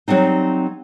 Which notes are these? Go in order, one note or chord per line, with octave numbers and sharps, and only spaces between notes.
F#3 G3 C4 D#4